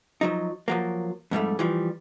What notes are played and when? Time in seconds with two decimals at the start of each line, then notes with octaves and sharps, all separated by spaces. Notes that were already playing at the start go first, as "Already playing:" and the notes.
0.21 F3 F#3 D#4
0.68 F3 F#3 A#3
1.31 F2 G#2 G3 A3
1.59 E3 F3 G3